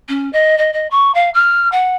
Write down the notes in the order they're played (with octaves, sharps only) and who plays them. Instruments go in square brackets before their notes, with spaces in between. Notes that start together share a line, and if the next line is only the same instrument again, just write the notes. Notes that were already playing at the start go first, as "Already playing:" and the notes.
[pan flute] C#4
D#5
D#5
D#5
C#6
F5
F6
F#5